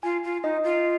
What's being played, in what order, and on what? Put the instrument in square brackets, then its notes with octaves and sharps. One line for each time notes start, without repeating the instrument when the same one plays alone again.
[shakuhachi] F4 [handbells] G#5
[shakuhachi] F4
[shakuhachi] D#4 [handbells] D#5
[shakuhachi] F4